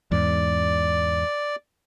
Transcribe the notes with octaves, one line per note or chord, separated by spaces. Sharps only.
E2 G#2 D5